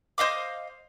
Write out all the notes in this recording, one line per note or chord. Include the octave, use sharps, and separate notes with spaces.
C5 D#5 F5 D6